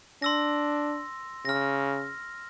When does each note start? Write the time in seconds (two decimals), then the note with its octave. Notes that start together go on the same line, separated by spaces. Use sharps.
0.22 D4 C6 E6 A#6
1.45 C#3 F6 A#6